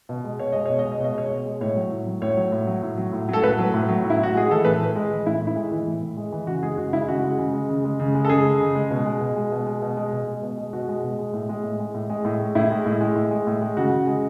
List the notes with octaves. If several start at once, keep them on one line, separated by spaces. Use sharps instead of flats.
B2
G#3
B2 C#5
G#3 D#5
B2 C#5
D#5
G#3
C#5
B2 D#5
G#3 C#5
B2
G#3
A2 C#5
F#3
A2
F#3
A2 C#5
F#3
A2
F#3
A2
F#3
A2
F#3 A4
A2 B4
F#3
A2
F#3
A2
E4
A2 F#4
G#3 G#4
E3 A4
A2 B4
A2
G#3
E3
A2 E4
A2
E4
G#3
E3
A2
A2
G#3
E3
C#3 F#4
G#3 G#4
C#3 F#4
G#3 E4
C#3 F#4
G#3
C#3
G#3
C#3
G#3
C#3
G#3
A4
C#3 G#4
G#3
C#3
G#3
B2
G#3
B2
G#3
B2
G#3
B2
G#3
B2
G#3
B2
G#3
B2 F#4
G#3
B2
G#3
A2
G#3
A2
G#3
A2
G#3
A2
G#3
A2 E4
G#3
A2
G#3
A2
G#3
A2
G#3
C#3 F#4
C#3
G#3